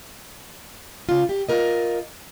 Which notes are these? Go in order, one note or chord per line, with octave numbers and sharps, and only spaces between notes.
C#3 F4
G4
F4 A#4 D#5